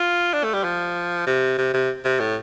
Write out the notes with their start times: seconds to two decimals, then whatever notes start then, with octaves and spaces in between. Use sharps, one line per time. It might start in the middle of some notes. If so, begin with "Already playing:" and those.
Already playing: F4
0.33 D4
0.44 A3
0.54 G3
0.64 F3
1.27 C3
1.58 C3
1.74 C3
2.05 C3
2.20 A2